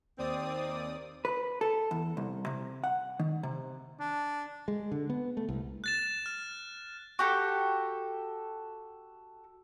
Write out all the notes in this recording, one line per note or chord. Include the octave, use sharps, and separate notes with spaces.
D#2 C4 D5 D#6
B4
A4
E2
C2
C3
F#5
D#3
C3
D4
G#3
D3
B3
A3
C2
F#6 A6 E7
F6
F#4 G4 A4